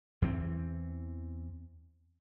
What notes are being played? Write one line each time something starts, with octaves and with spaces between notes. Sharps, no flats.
E2 E3 C4